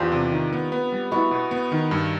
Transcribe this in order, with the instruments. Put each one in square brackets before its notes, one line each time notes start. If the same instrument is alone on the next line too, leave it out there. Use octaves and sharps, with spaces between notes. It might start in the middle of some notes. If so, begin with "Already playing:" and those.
Already playing: [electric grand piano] E2 [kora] C4 D4 F4 G4
[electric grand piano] C3
D#3
B3
B3
G3
[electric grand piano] B3 [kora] E4 F#4
[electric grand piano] B2
B3
D#3
G2